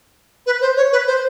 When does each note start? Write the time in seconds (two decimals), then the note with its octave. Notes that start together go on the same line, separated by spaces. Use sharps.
0.46 B4
0.61 C5
0.77 C#5
0.92 B4
1.07 C5